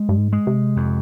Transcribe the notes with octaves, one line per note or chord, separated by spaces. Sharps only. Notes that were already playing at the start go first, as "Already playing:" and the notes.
Already playing: G#3
G2
G#2
G#3
C3
F2